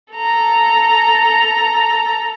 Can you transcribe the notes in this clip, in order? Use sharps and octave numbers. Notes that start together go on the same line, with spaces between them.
A4 A#5